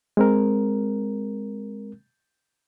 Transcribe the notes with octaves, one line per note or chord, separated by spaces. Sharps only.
G#3 C4 A#4